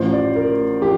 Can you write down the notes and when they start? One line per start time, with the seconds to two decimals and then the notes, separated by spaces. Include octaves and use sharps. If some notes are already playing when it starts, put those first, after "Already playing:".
Already playing: A1 A2 F3 C5
0.12 D5
0.36 A#4
0.82 F3 G4